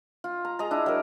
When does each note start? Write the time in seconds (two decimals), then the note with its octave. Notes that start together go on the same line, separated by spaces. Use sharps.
0.24 F4
0.45 A#5
0.59 G#4 D#5 A#5
0.71 D4 E4
0.86 F#3 A#4